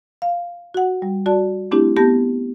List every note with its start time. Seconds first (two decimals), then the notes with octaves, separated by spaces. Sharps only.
0.22 F5
0.74 F#4 F#5
1.02 G3
1.26 F#4 D5 A5
1.71 A3 C4 D4 E4 G4
1.97 B3 G4 A5 G6 A#6